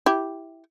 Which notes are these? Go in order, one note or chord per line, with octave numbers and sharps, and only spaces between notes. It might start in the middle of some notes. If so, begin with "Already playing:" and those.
E4 G4